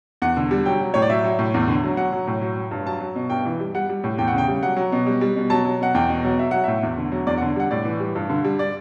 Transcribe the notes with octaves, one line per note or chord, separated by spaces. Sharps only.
E2 F#5
D3
G3
F#3 G5
F#3
A2 C#5
D5
F#3 E5
F#3
A2
E2
D3
F#3
F#3 F#5
F#3
A2
F#3
F#3
G2
F#3 A5
F#3
B2
G2 G5
E3
G3
G3 F#5
G3
A2
E2 G5
F#5
C#3
G5
G3
F#3 F#5
F#3
B2
G3
G3
B2
F#3 A5
F#3
B2 F#5
E2 G5
B2
F#3
F#3 E5
F#3 F#5
A2 E5
E2
D3
F#3
E2 D5
F#5
D3
G3 F#5
A2 D5
E3
G3
G2
D3
G3
D5